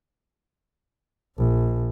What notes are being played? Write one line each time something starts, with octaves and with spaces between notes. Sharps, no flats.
A#1